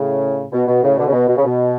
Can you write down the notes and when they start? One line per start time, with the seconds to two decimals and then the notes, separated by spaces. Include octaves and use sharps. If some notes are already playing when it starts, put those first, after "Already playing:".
Already playing: A2 C#3
0.52 B2
0.67 B2
0.82 A2 C#3
0.97 B2 D3
1.08 C#3
1.12 B2
1.28 B2
1.37 C#3
1.44 B2